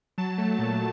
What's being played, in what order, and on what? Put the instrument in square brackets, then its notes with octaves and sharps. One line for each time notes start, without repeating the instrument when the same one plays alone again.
[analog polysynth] F#3 A5
A3
A#2